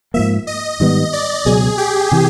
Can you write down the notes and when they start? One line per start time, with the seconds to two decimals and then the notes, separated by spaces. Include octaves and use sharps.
0.14 G#2 F3 A#3 E5
0.47 D#5
0.80 G#2 D#3 G3 B3 D#5
1.13 D5
1.45 C#2 B2 F#3 B3 G#4
1.78 G4
2.12 C3 E3